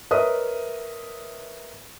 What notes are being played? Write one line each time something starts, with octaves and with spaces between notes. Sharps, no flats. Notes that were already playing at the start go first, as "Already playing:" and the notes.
A#4 B4 C#5 D#5 E5 D#6